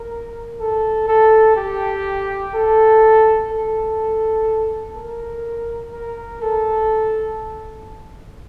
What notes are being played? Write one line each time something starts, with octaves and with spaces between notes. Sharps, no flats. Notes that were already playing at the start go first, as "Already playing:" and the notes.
Already playing: A#4
A4
A4
G4
A4
A4
A#4
A#4
A4